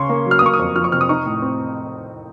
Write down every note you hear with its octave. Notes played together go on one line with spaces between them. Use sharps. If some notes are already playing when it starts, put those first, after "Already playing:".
Already playing: C#3 C#4 C6 C#6
A#3
F#3
F6
D#6
A#3 C#6
D#6
F2
F3 F6
C#6
C3 F6
D#6
D#4 C#6
A2
C4